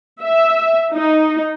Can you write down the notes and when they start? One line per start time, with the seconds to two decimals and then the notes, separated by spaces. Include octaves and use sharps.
0.22 E5
0.93 D#4